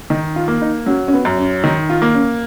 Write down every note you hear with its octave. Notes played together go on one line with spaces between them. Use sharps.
D#3 D#4
F4
A#3
D#4
F#3 C#4
C#4
B3
F#2
C#4
D#3 D#4
F4
A#3
C#4